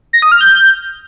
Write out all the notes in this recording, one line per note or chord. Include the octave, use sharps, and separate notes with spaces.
A#6
D#6
F6
G6